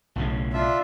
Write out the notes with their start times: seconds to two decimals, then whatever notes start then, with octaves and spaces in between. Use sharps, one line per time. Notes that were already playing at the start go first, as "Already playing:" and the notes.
0.16 B1 A2 C#3
0.53 D4 F4 E5